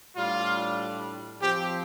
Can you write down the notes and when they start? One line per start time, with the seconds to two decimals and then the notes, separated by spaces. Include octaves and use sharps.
0.17 A2 G3 D4 F4
1.41 F3 C4 G4